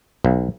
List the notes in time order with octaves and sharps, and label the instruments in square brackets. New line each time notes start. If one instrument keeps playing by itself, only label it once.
[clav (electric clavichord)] B1